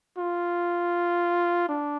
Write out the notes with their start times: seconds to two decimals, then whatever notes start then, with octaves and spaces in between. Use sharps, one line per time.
0.18 F4
1.69 D4